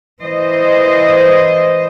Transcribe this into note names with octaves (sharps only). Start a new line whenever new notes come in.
E3 C5 D#5